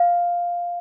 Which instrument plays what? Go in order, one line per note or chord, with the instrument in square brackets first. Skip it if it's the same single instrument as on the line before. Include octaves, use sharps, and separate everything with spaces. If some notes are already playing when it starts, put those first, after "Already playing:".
Already playing: [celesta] F5